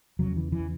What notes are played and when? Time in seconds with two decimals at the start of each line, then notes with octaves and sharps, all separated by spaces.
0.19 E2 C#3 F#3
0.37 E3
0.52 E3